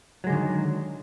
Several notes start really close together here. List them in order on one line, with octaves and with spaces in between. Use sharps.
F#3 G#3 D3 D#3